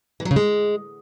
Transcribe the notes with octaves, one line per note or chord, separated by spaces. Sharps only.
E3
F#3
C#3
G#3